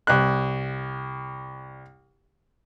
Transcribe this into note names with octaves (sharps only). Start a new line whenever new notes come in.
C2 F#6